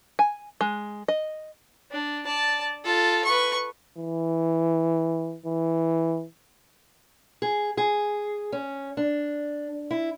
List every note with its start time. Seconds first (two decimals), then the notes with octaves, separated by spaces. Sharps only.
0.19 G#5
0.61 G#3
1.08 D#5
1.91 D4
2.25 D5 A5
2.84 F4 A4
3.25 B4 C#6
3.98 E3
5.46 E3
7.42 G#4
7.77 G#4
8.52 C#4
8.97 D4
9.91 E4